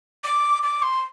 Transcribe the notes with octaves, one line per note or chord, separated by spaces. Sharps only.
D6
D6
C6